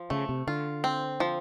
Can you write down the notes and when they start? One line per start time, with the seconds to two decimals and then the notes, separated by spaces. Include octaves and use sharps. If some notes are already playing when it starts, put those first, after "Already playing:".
Already playing: F3
0.10 C#3 A3
0.29 C3
0.47 D3 F4
0.84 C4
1.20 F3